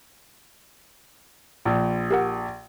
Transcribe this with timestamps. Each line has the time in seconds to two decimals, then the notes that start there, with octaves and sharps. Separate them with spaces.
1.65 A#1
2.11 G4 A#4 F#5